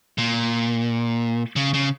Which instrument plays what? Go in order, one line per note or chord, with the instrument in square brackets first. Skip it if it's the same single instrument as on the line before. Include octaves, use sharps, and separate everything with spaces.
[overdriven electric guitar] A#2
C#3
C#3